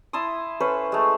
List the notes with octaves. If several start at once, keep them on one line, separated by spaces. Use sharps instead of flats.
E4 A5 C6 D#6
C#4 A4 B4 C5
G#3 A3